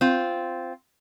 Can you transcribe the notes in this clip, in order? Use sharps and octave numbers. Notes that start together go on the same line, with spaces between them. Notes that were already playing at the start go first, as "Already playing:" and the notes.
C4 F4